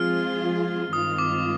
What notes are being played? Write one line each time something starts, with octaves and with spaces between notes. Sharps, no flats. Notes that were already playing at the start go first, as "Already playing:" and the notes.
Already playing: F3 G#3 C4 F4 G#4 F6
G2 D#3 G#3 C4 F4 D#6
D6